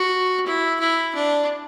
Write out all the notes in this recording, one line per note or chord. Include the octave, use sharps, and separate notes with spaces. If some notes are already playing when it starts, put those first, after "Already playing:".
Already playing: F#4
E4
E4
D4